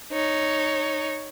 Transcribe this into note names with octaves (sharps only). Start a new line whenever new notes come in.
D#4 C#5